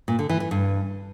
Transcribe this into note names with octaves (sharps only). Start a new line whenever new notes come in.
A#2
D3
E3
E3
G2